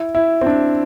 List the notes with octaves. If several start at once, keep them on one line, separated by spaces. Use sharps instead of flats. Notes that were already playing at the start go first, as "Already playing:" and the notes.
Already playing: E4
E4
C4
D4